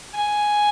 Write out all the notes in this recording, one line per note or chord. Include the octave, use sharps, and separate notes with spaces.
G#5